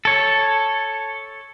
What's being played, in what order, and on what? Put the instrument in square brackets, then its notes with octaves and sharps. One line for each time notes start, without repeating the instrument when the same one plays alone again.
[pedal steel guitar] A4 C#5